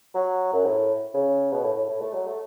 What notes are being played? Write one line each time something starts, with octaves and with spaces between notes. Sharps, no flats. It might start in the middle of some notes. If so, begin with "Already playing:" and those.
F#3
F#2
A2
C#3
B2
A2
A2
A2
A3
F#3
A3